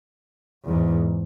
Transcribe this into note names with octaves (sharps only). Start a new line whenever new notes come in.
E2 G#2